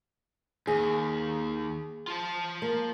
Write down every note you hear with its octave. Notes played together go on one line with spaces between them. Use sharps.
D#2 G#4
F4 A5
A#3